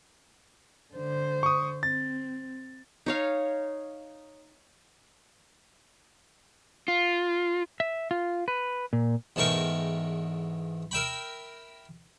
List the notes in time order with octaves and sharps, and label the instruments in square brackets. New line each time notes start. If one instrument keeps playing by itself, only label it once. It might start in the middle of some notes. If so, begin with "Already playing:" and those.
[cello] D3 C5
[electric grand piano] C#6 D#6
[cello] C4 [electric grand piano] A6
[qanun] D#4 C#5 F5
[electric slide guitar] F4
E5
F4
B4
A#2
[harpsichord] E2 G#2 A3 A#4 G5 C#6
A#4 E5 G5 B5